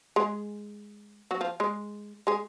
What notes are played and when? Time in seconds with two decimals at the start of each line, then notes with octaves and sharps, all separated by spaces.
0.16 G#3 G#4
1.31 F#3 F#4
1.41 F3 F4
1.60 G#3 G#4
2.27 G#3 G#4